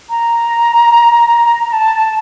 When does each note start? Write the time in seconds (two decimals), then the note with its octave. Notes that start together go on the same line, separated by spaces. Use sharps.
0.10 A#5
1.72 A5